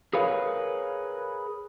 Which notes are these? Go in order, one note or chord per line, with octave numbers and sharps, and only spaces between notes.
G#4 A#4 B4 C#5 F5